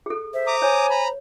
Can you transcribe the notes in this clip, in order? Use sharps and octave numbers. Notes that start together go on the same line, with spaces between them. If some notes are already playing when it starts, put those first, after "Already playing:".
G#4 A4
C5 E5
A#5 D6 D#6
C#5 G#5
A#5 B5